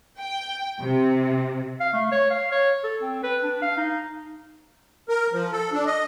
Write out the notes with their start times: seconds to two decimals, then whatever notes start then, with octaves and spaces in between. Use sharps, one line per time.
0.19 G5
0.80 C3
1.80 F5
1.93 A3
2.12 C#5
2.31 F5
2.52 C#5
2.84 A4
3.02 C4
3.23 B4
3.43 D4
3.62 F5
3.78 D#4
5.09 A#4
5.33 F3
5.52 A4
5.73 D4
5.86 D#5